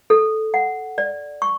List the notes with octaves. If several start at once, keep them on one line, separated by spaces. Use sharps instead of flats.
A4
F#5
D5
C#6